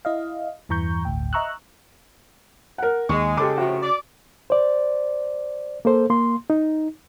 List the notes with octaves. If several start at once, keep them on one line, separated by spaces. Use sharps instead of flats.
E4 D#5 F5
E2 G2 E3 A#5 C#6 G6
G1 D2 A2 G5
D#5 E5 A#5 C#6 E6 F#6
A#4 F#5
D#2 G#3 C#6
C#3 G4 A4 D6
A2 C3 F3 F#4
D5
C5 D5
A#3 A4 C5
A#3 C6
D#4